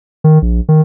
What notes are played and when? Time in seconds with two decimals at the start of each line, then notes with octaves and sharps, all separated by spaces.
0.24 D#3
0.42 A#1
0.69 D#3